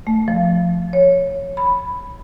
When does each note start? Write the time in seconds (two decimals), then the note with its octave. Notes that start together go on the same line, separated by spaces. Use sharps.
0.07 A3
0.28 F3
0.93 C#5
1.57 B5